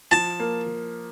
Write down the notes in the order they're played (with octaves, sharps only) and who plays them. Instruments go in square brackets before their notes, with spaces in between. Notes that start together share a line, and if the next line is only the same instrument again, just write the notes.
[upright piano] F3 [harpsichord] A5
[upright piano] A#3